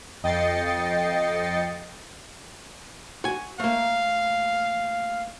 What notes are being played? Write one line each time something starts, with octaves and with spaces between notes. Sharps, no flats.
F2 D#5 G5 A6 C7 C#7
F#4 G#5
A3 A#3 F5